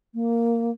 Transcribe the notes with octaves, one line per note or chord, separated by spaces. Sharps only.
A#3